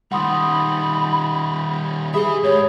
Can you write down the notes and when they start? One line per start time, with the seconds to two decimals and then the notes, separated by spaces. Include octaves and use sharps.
0.12 D#3 G3 F#5 B5 C6 D#6
2.14 G4 G#4 B4 E5 B5 D#6
2.43 G#2 C#5